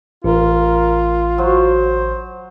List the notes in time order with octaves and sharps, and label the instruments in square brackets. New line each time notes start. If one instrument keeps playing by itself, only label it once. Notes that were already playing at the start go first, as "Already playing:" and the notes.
[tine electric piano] A1 [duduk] F4 [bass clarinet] A#4
[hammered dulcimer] F#3 [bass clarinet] C5